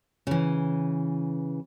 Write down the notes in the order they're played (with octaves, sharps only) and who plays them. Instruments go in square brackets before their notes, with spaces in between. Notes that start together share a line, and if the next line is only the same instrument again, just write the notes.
[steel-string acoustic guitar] C#3 E3